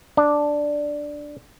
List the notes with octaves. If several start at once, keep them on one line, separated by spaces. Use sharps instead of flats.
D4